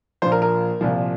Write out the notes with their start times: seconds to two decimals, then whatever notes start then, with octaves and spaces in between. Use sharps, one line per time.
0.22 A#1 A#2 F3 C5
0.32 A#4
0.42 A#4
0.81 C2 A#2 F3